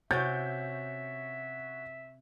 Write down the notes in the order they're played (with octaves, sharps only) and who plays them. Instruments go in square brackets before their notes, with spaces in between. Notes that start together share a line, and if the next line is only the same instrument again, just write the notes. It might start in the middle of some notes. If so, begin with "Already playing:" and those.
[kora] C3 C#4 G5 [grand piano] F#4 C#5 A6 [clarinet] E5 [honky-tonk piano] G6